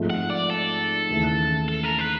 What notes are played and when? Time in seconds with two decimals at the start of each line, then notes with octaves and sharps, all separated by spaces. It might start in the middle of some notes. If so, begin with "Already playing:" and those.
Already playing: G#2 F3 A3 C4 D#4
0.10 F#5
0.30 D5
0.50 A4
1.09 D#2 C#3 E3 A3
1.69 A4
1.83 A#4
1.99 B4